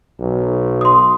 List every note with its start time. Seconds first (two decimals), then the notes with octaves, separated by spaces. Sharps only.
0.20 B1
0.81 C6 D#6